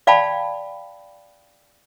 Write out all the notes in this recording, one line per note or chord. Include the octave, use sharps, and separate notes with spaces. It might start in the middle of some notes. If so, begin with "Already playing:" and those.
D5 F5 G5 A5 B5